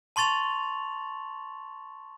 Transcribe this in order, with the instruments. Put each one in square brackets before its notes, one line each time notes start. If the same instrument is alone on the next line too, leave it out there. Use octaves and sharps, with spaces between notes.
[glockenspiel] A5 C6 C#6 A6 F7 F#7